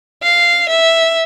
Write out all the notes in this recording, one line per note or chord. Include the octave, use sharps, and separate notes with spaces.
F5
E5